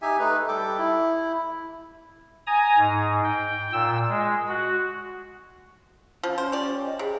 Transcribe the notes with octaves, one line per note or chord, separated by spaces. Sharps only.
D#4 G4 E5 G#5
A3 D#4 B4
G3 A4 G5 D6
E4
G#5 A#5 D#6
G#2
G5
A#2 E6
G#3
F#4
F3 C#4
C#4 C5
G4 D5
D#5
C3 G#4